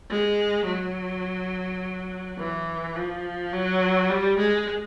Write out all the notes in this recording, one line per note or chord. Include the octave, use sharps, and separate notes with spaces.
G#3
F#3
E3
F3
F#3
G3
G#3